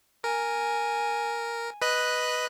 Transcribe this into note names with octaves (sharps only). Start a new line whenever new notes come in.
A#4 G#5
B4 D#5 F#6